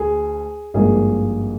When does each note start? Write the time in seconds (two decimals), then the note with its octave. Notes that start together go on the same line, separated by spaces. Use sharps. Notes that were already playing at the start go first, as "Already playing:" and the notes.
Already playing: D2 G#4
0.74 G#1 G2 F3 A#3 G#4